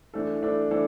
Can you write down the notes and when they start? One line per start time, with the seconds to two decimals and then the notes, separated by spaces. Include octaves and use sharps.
0.14 E3 A3 D4 A4
0.42 E3 A3 D4 A4
0.71 E3 A3 D4 A4